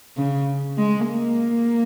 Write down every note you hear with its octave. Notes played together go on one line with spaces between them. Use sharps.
C#3
G#3
A#3